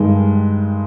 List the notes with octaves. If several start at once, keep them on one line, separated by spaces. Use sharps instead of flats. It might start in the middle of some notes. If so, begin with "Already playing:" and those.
Already playing: G2 D#3 G#3